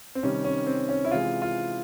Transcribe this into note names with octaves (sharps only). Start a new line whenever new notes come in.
C4
C3 D#3 G3 C#4
C#4
C4
C#4
E4
C3 E3 G#3 F4
F4